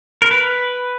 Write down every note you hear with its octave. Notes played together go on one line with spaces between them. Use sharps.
A#4
B4